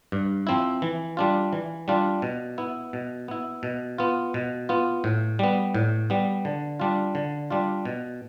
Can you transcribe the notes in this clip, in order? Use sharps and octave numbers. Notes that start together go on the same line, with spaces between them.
G2
F3 C4 E4
E3
G3 D4 F4
E3
G3 D4 F4
B2
B3 E4
B2
B3 E4
B2
B3 F4
B2
B3 F4
A2
G3 B3
A2
G3 B3
D3
G3 D4 F4
D3
G3 D4 F4
B2